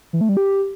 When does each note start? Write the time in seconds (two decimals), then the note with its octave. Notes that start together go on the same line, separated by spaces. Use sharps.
0.13 E3
0.21 A3
0.29 G3
0.37 G4